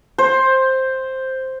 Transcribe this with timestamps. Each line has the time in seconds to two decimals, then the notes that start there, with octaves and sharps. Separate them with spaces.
0.18 C5